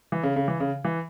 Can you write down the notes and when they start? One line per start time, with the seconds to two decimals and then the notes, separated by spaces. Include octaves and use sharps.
0.12 E3
0.23 C#3
0.36 C#3
0.48 E3
0.60 C#3
0.84 E3